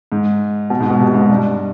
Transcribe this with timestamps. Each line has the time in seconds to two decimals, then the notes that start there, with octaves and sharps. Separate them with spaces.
0.12 G#2
0.70 B2
0.80 G#2
0.90 B2
1.00 C3
1.08 B2
1.14 G#2
1.21 B2
1.30 G2